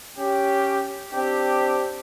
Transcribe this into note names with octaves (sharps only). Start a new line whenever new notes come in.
C#4 G4
C4 D4 G4